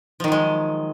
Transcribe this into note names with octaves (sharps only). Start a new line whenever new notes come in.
D#3 F3 F#3 G#3